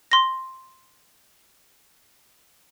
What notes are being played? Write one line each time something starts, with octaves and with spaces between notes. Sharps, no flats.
C6 A#6